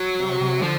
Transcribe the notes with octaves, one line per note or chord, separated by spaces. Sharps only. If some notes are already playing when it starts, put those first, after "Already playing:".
Already playing: F#3
C3
C3
D3 F3